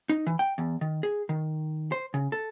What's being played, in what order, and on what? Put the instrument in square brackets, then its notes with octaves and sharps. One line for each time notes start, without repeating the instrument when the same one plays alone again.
[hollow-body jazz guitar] D#4
E3
G5
E2
D#3
G#4
D#3
C5
C#3
A4